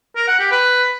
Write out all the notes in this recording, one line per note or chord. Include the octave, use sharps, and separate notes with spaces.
A#4
F#5
G4
B4